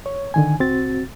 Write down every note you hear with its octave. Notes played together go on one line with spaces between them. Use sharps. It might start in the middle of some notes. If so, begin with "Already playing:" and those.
C#5
D3 D#3 G#5
C2 C4 F#4 A6